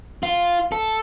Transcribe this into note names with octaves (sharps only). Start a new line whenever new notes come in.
F4
A4